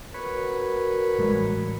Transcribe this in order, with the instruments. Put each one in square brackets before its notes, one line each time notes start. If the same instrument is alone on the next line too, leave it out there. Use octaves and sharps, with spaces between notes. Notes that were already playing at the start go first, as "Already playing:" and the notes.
[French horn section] F#4 A#4 [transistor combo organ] B4 C#5
[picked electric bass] A1 G3 G#3